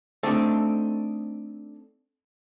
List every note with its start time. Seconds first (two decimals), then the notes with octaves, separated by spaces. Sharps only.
0.23 A3 C4 D4 D#4 A4